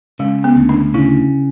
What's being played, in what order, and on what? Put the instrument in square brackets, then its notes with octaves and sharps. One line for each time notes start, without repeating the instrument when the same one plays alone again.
[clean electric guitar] C#3 [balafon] G#3
[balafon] B3
[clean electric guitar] D2
[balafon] D4
[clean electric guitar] C#3 [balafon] E4